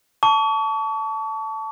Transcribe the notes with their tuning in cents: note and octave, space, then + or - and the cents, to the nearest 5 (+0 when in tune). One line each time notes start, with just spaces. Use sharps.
A5 +0 C#6 +40